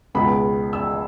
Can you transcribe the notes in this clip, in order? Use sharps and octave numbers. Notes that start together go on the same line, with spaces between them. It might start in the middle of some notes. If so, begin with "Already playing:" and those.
C#2 B2 G#3 B3 B5
E6